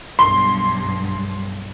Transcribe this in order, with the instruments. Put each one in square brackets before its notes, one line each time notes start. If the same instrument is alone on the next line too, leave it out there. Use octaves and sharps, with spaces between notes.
[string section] B1 G2 [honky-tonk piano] C6